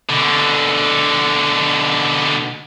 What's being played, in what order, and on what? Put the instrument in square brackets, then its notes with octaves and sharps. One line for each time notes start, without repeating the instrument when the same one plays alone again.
[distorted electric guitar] B2 D3